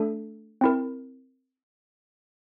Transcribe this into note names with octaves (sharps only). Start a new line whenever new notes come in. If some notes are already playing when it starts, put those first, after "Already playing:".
Already playing: A3 D4 A4
C4 E4 A#4